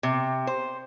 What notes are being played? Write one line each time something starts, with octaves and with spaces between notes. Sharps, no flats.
C3
C5